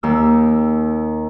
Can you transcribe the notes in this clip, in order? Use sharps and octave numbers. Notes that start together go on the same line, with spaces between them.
D#2 E6